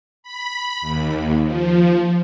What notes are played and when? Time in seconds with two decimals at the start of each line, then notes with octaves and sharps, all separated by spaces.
0.23 B5
0.81 D#2
1.44 F3